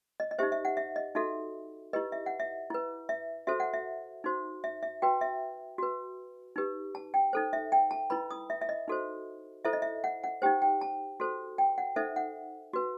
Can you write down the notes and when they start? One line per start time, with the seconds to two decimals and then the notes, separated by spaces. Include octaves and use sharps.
0.20 D#5
0.31 D#5
0.39 D#4 G4 C5 E5
0.52 E5
0.65 F#5
0.77 E5
0.96 D#5
1.15 D#4 F#4 A4 E5
1.93 E4 G4 B4 D#5
2.12 E5
2.26 F#5
2.40 E5
2.70 E4 B4
3.09 E5
3.47 F#4 A4 C5 E5
3.60 F#5
3.73 E5
4.24 D#4 F#4 C5
4.64 E5
4.83 E5
5.02 F#4 B4 G5
5.21 E5
5.78 F#4 B4
6.56 D#4 G4 B4
6.95 A5
7.14 G5
7.33 D#4 A4 C5
7.53 E5
7.72 G5
7.91 A5
8.10 E4 B4 B5
8.31 D#6
8.50 E5
8.61 E5
8.69 D#5
8.88 D#4 F#4 A4 C5
9.65 E4 A4 C5 E5
9.73 D#5
9.82 E5
10.04 F#5
10.24 F#5
10.42 D#4 G4 C5 G5
10.62 G5
10.81 A5
11.20 F#4 A4 C5
11.58 G5
11.78 F#5
11.96 D#4 A4 C5 E5
12.16 F#5
12.73 F#4 B4